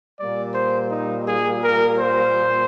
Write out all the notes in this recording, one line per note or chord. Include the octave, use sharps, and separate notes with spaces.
A#2 G3 A#3 D5
C5
D#4
G#4
A#4
C5